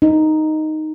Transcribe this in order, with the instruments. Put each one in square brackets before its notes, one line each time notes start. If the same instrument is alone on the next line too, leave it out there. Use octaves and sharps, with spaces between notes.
[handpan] D#4